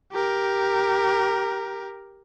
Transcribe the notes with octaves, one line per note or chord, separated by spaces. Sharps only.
G4 A#4